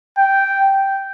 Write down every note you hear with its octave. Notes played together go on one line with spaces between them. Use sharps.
G5